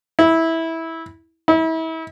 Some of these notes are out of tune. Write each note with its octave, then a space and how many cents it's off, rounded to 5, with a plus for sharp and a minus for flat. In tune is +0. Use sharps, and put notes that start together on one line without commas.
E4 -15
E4 -35